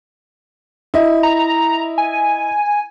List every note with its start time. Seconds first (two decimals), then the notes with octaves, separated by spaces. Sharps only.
0.94 E4 D#5
1.23 A#5
1.98 G#5